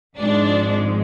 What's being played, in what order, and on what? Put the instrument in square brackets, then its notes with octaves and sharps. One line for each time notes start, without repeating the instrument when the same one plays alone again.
[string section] G#1 G#2 F3 G#3 D4